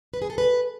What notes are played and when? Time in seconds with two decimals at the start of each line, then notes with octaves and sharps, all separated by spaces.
0.14 B4
0.22 G#4
0.30 A4
0.38 B4